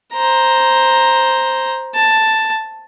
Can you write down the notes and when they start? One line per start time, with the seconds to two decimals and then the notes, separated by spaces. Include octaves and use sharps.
0.14 C5 A#5
1.95 A5